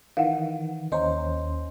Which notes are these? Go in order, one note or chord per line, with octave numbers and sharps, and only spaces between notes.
D#3 E3 F5 F#5
D#2 C#4 C5 D#5 A#5